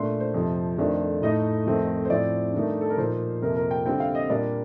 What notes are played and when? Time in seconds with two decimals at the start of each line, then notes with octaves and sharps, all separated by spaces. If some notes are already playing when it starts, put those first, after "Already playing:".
Already playing: A#2 A3 D4 C6
0.20 C5
0.34 F2 C3 F3
0.78 F2 D#3 A3 D4
1.22 A2 A3 D#4 D#5
1.66 F2 D#3 A3 C4
2.05 C5
2.10 A2 F3 C4 D5
2.54 G2 D#3 A3 D#4
2.81 A4
2.90 A#4
2.98 A#2 F3 A#3 D#4 C5
3.42 F2 C3 F3 A#3 A#4
3.56 A#4
3.71 G5
3.86 D3 G3 C4 G5
4.00 F5
4.15 D#5
4.29 A#2 G3 A#3 D4 D5